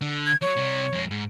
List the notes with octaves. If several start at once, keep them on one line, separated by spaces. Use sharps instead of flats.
D3
G#6
F3 F#3 C#5
C3 G3
F2 G#3
G#2